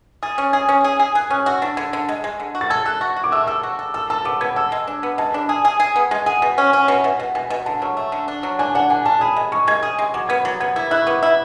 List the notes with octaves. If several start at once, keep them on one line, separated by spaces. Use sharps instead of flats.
G#4 A6
C#4
G#4 G#6
C#4
G#4
G#4
G#4 F#6
C#4 F#6
F#4 E6
D4 A6
D3 G#6
D3
G#3
G#3
D3
F#4
A6
A4 G#6
A4 F#6
F#4
F#4
D6
A3 E6
A4 E6
F#4
A4
A4 E6
A4 A5
B3 D6
B3 G#6
A4 E6
G#3
D4
B3
G#3 A5
D4 B5
G#4 A5
G#4
G#4
B3
G#3 G#5
G#4 F#5
B2 F#5
C#4
C#4 F#5
G#5
B2 F#5
E5
B2 F#5
B2 F#5
B2 G#5
B2
D3 A5
F#3 C#6
A3
D3
D4
F#3
D4 G#5
D4 F#5
D4 G#5
D4 A5
G#4 B5
G#3
G#3 C#6
G#3 G#6
G#4
G#3
F#3 D6
B3 G#6
F#3 A6
B3 G#6
E4 G#6
E4 F#6
C#6
B3 D6
E4